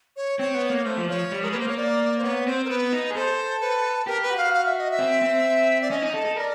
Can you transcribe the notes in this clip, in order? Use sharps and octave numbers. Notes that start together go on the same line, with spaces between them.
C#5
C4 C#5
B3
A#3
A3 C5
F3
F3 C#5
G3
G#3 A#4
A#3 B4
C5
A#3 C#5
D5
C5
B3 C#5
C4 C5
A#4
B3 B4
D#4
G#4
A4 C5
B4
G4 A#4
B4
F#4
F5
F5
E5
D#5
E5
C4
C4
D5
C#4 D#5
D#4
A4
A4
A#4 D5